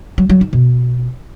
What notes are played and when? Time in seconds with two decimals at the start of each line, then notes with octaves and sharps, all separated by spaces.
0.18 F#3
0.30 F#3
0.41 D#4
0.53 B2